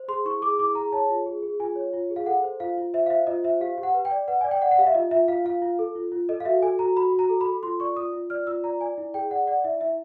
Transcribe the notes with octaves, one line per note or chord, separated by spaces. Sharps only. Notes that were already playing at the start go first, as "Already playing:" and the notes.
Already playing: C5
G#4 C6
E4 C#6
G#4 D6
E4 D6
G#4 A#5
C#5 A5
F4
G#4
G#4
F4 G#5
C#5
F4
G#4
F5
A4 F#5
C5
F4 F5
F4
C5 E5
F5
C5 E5
F4 D#5
C5 E5
G4 F5
G4
F#5
B4
G5
D5
B4 F#5
D5 G#5
G5
D5 F#5
F#5
G4 F5
E5
F4 D#5
F4 E5
F4 F5
F4 F5
F4
A4
F4
F4
A4 D#5
F5
F#4 E5
A4 G#5
F#4 A#5
F#4 B5
F#4
A#5
A4
B5
A4
F4 C6
D5 C#6
F4 D#6
F4
D5 F6
F4 E6
D5 A#5
D5 G#5
E4
G#4 G5
D5 F#5
D5 F#5
E4 E5
E4 E5